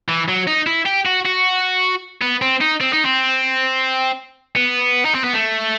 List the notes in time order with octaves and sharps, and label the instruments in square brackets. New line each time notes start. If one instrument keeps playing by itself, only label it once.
[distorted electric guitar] E3
F#3
D#4
E4
G4
F#4
F#4
B3
C4
D#4
C4
D#4
C4
B3
D#4
C4
B3
A3